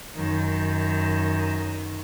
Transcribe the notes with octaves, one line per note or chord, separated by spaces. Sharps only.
F#2 D#3